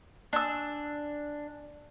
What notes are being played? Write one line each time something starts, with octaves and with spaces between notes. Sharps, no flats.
D4 G#5 E6